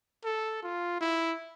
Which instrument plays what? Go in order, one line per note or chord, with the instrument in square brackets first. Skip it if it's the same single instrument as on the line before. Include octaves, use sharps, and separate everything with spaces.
[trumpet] A4
F4
E4